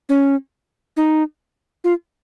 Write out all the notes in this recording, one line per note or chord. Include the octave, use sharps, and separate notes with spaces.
C#4
D#4
F4